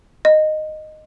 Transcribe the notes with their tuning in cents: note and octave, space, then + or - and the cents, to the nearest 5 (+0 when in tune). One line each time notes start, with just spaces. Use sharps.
D#5 -10